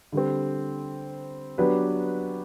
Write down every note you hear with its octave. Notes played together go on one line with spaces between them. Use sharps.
D3 G3 C4
F#3 B3 D4 G4 B4